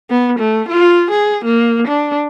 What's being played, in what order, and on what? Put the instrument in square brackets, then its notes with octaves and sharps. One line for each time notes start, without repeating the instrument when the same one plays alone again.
[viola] B3
A3
F4
G#4
A#3
D4